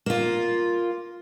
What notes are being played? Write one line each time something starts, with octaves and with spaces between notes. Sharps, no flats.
A#3 F4